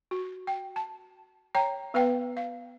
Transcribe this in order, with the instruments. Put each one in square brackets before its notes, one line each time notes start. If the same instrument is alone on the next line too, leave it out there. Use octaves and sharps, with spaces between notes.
[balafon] F#4
G5
A5
C#5 G5 A#5
B3 B4 F5 G5
F5